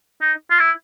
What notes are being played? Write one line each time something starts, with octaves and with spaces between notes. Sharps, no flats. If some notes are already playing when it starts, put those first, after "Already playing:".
D#4
F4
E4